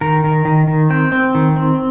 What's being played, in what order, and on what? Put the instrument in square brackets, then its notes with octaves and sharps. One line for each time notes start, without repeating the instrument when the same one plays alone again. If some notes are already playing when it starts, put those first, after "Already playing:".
[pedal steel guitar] D#3 A#4
D#3
D#3
D#3
C4 G5
C4
D#3
C4